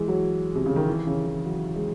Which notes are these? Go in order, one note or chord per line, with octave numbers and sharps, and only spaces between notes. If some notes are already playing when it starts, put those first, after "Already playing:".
Already playing: E3 G#3
F#3
C3
C#3
D#3
E3
C#3
E3
F#3
G#3